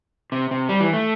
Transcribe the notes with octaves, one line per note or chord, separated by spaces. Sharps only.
C3
C3
G3
E3
A3